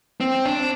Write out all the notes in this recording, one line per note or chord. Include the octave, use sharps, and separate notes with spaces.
C4
D4